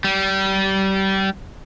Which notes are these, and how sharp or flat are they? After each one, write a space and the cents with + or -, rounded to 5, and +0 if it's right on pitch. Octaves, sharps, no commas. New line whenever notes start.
G3 -25